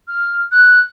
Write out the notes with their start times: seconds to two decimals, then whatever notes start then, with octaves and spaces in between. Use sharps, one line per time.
0.08 F6
0.52 F#6